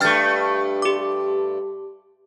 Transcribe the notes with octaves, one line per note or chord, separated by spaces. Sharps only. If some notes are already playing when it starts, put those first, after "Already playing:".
G2 A3 G5 F6 A6
G4 D6